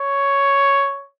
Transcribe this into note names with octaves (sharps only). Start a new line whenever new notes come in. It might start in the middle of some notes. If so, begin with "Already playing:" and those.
Already playing: C#5